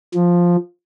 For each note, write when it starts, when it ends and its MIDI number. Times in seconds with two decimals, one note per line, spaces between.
0.14 0.56 53